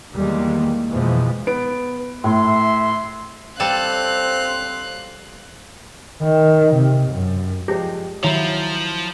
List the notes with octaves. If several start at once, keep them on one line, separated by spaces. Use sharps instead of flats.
E2 D#3 G3 G#3 A#3
F2 B2 E3 F3 G#3
B3 D7
A2 E5 C6
G3 C4 A4 F5 A5 F#6
D#3
C3
F#2
F3 G#3 G4
D#3 F3 F#3 E4 C#5 A#5